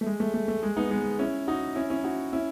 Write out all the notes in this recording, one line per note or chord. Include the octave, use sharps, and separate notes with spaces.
A3
G#3
A3
A3
A3
G#3
B3 D#4
G#3 B3
C#4 E4
D#4 F#4
C#4 E4
C#4 E4
D#4 F#4
C#4 E4